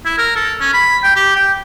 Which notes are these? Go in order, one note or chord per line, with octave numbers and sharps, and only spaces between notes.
E4
A#4
A4
C#4
B5
G5
G4
G5